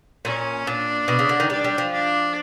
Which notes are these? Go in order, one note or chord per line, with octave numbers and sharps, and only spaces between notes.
A#2 C#4
A#2 D4
B2
C#3
D3
D#3
G3 D4
G3
F3
D4